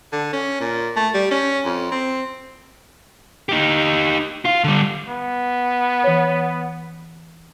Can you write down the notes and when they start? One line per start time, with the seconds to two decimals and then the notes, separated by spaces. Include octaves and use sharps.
0.12 D3
0.33 C#4
0.60 A#2
0.96 A3
1.14 G3
1.31 C#4
1.65 F2
1.92 C4
3.49 D#4 G4
4.45 F4 F5
4.64 D3 G3
5.08 B3
6.04 E3 C#5